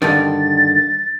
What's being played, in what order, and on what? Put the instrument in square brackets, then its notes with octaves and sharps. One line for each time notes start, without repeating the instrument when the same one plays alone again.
[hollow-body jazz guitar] G2 D3 D#3 [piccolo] A6